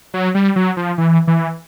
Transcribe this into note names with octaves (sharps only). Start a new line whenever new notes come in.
F#3
G3
F#3
F3
E3
E3